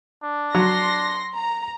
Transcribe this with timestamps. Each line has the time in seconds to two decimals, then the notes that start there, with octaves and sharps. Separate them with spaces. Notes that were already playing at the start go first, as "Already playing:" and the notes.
0.24 D4
0.55 F#3 C6 A#6
1.35 A#5